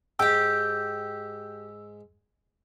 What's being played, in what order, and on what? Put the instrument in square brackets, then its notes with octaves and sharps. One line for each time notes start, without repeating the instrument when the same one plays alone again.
[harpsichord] G#2 G#3 [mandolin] G4 G5 [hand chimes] E6